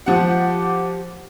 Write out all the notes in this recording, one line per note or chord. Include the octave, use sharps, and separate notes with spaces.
F3 G4 F#5